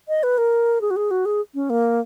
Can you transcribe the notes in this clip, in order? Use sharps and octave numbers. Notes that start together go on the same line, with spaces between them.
D#5
B4
A#4
G#4
F#4
G#4
F#4
G#4
C#4
A#3